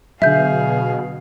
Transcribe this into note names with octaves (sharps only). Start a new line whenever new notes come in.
B2 D3 F#3 G#4 E5 F5 G6